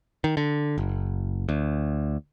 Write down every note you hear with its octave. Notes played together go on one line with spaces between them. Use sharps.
D#3
D3
F#1
D2